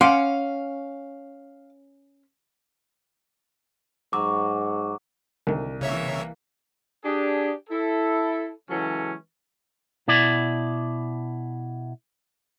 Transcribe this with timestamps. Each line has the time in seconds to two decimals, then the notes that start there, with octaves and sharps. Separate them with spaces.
0.01 C#4 F5 F#5 C6 D6
4.13 G#2 F#3 D6
5.47 C2 D3 D#3
5.81 C#3 E3 A#3 C#5 E5
7.04 D4 G4 G#4
7.70 E4 A4
8.69 C#3 E3 F#3 G#3 C#4 A4
10.08 B2 E4 D5